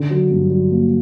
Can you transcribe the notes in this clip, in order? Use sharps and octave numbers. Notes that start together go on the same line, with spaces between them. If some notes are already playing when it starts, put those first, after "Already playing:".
Already playing: D3
F#3
G2
F#3
A#3